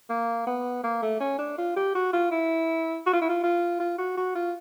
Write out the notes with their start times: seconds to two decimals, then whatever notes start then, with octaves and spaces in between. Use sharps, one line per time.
0.09 A#3
0.47 B3
0.84 A#3
1.02 A3
1.20 C#4
1.39 D4
1.58 F4
1.76 G4
1.95 F#4
2.13 F4
2.31 E4
3.06 F#4
3.13 F4
3.21 E4
3.29 F4
3.43 F4
3.80 F4
3.98 F#4
4.17 F#4
4.35 F4